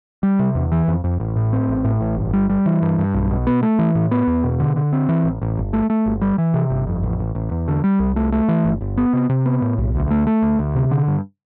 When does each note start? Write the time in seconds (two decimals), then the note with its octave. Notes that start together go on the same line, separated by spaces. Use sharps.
0.23 G3
0.39 C3
0.55 E2
0.72 E3
0.88 F2
1.04 F2
1.20 A1
1.36 A2
1.53 C4
1.68 A1
1.85 A2
2.01 A1
2.17 G1
2.33 G3
2.49 G3
2.66 E3
2.82 G2
2.98 G2
3.14 B1
3.31 B2
3.47 B3
3.63 A3
3.79 E3
3.95 A2
4.11 B3
4.27 E2
4.44 B2
4.60 D3
4.76 D3
4.93 C4
5.09 E3
5.24 A1
5.42 A1
5.57 G1
5.73 A3
5.90 A3
6.06 G1
6.21 G3
6.38 E3
6.54 C3
6.70 G1
6.87 F2
7.03 A1
7.19 A1
7.35 A1
7.51 E2
7.68 D3
7.84 G3
8.00 C2
8.16 A3
8.32 A3
8.48 E3
8.65 G1
8.81 G1
8.97 B3
9.13 C3
9.29 C3
9.46 B3
9.62 A2
9.78 B1
9.95 D2
10.11 A3
10.27 A3
10.43 D2
10.59 D2
10.75 C3
10.91 D3
11.08 G2